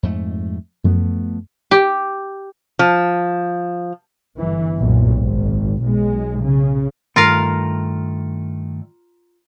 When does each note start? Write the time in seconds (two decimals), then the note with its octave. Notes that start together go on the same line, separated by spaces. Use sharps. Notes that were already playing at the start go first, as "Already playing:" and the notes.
0.03 F2 G#2 A3
0.84 F#2 F3 A3 B3
1.71 G4
2.79 F3
4.39 G1 E3
4.78 F#1 B1 A#2
5.13 G#1
5.83 B1 G#3
6.42 C#3
7.16 G2 D#3 A3 F4 A#4 F5